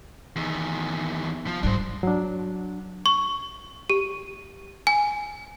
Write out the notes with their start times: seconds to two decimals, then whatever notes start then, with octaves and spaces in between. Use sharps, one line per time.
0.36 E2 D#3
1.47 F3
1.63 G#2 G3 D4 C5
2.03 F#3 D4
3.06 C#6
3.90 G4
4.87 G#5